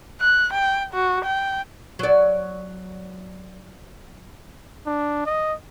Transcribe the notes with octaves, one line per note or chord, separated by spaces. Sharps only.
F#6
G5
F#4
G5
F#3 D5
D4
D#5